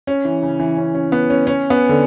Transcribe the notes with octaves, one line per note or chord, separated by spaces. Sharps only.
C#4
E3
C#3
E3
C#4
C#4
B3
C#4
C#4
B3
D3